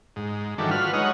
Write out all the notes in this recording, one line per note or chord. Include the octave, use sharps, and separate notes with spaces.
G#2
D#3 E3 F#3 G3 A3 D4
F4 F#4 B4 F6
F#3 G#3 D#4 C#5 D#5 F#5